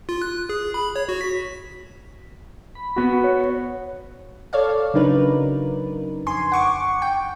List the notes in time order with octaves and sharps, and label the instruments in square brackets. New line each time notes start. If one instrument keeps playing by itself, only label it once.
[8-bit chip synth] F4
F#6
G#4
B5
C#5
F#4
B6
[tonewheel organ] B5
[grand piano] B3 F#4
[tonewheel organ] C#5
[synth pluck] A4 C#5 D5 F5
C#3 F#3 D4 D#4 A#4 B4
F2 G#5 C6
F#5 C#6 D6
G5